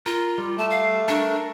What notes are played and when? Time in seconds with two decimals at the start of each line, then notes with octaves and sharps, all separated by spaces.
0.06 F4 A#4
0.38 G3
0.58 A3 A5
0.70 F5
1.08 D4 A4 A#4 C#6